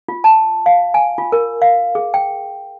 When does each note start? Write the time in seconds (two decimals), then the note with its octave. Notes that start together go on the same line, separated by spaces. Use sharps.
0.08 F4
0.24 A5
0.66 F5
0.94 G#5
1.18 F4
1.32 A#4
1.62 F5
1.95 G#4
2.14 G5